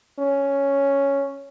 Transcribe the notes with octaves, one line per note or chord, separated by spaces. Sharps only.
C#4